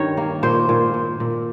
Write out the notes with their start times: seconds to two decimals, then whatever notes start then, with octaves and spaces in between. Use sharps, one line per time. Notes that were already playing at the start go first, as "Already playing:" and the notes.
Already playing: G2 D#3 C#5
0.17 A#3
0.43 A#2 C5
0.69 A#2
0.94 A#2
1.20 A#2